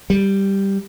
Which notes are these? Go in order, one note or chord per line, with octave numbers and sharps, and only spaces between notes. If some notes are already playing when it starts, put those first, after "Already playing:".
G3